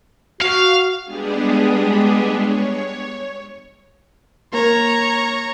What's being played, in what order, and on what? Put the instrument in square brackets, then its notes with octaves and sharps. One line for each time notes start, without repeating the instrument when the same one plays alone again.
[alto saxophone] F#4 [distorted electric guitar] F5
[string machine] G3 G#3 B3 D4 G4 G#4
C#5
[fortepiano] A#3 [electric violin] C#5 A#5